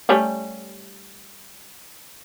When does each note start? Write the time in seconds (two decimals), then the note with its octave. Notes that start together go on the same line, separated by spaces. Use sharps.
0.09 G3 A3 C#4